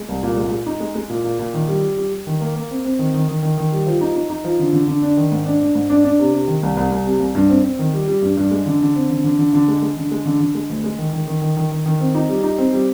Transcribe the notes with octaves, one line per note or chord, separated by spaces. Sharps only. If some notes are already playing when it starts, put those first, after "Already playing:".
Already playing: G#3
C2
A#2
G#3
G#3
D#4
G#3
G#3
A#2
A#2
A#2
D#3
G3
G3
G3
G3
D#3
A#3
A#3
C4
C4
D#3
D#3
D#3
D#3
D#3
G3
F3
D#4
D#4
D#4
F3
D3
D3
D3
D4
D#3
G#2
D4
D4
G#2
D4
D4
C3
C3
D#3
C2
C2
C2
C3
C2
G2
C4
C4
D#3
G3
G3
G2
G2
G#3
D3
D3
C4
D3
D3
D3
D3
G#3
G#3
D3
G#3
D3
D3
G#3
D2
G#3
D#3
D#3
D#3
D#3
D#3
D#3
D#3
C4
D#4
G3
D#4
C4
G3